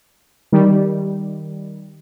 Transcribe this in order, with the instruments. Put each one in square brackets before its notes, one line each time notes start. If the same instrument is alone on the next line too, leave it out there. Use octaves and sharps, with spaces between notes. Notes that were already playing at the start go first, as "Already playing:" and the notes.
[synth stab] D#3 G3